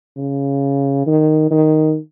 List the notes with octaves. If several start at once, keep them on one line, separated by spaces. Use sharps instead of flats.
C#3
D#3
D#3